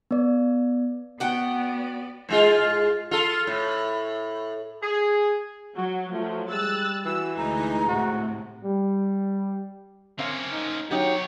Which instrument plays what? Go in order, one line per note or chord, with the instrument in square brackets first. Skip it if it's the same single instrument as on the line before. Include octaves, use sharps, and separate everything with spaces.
[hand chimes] B3 D5
[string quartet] B3 D5 [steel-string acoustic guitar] F#4 F#5 G5
[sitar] G#2 G#3 F4
F4 A4
A2
[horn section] G#4
[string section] F#3 [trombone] F#4
[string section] F3 F#3 [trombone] A3
[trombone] G3 [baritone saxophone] G#3 [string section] E6 F#6 A6
[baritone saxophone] E3 [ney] F#4 [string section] E6
[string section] D2 D#4 [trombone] G#3 [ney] A#5
[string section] A2 C3 [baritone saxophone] F#4
[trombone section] G3
[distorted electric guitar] A#3 C#4 [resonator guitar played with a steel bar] C4 F5
[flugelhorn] D#4
[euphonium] F#3 [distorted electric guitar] B3 C#5 [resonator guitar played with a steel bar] D#4 G4 [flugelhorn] G5